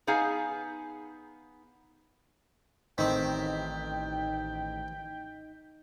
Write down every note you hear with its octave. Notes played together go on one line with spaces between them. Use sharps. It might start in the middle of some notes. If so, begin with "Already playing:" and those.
B3 D#4 G#4 F5 G#5 A#5
A1 D#3 C4 D#4 D#5 G5 B6